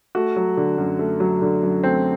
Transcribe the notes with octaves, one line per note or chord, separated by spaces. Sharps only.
A3 F#4
F#3
D3
F#2
A3
F#3
D3
F#2
A3 C4